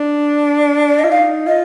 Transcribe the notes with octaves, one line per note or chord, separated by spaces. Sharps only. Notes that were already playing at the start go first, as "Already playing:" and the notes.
Already playing: D4
D5
D#5
F4
D#4 F5
F4 D#5